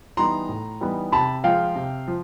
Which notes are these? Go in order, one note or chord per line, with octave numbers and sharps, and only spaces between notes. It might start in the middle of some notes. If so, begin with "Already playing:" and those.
E3 G3 B3 D#4 A#5 C6
A2
E3 G3 B3 D#4
C3 A5 B5
F3 G#3 F5 G5
C3
F3